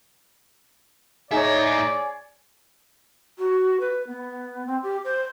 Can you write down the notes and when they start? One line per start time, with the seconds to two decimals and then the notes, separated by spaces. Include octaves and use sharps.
1.31 A2 D#4 G#4 C#5 D5 E5
3.38 F#4
3.80 B4
4.07 B3
4.67 C4
4.83 G4
5.04 C5